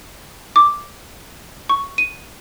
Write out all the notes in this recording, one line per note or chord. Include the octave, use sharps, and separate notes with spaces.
D6
C#6
D#7